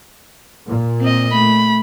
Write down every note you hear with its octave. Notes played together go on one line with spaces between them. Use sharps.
A#2
C4 D#5
A3 B5